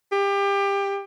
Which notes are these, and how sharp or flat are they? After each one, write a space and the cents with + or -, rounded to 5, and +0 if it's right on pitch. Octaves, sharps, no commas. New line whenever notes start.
G4 +25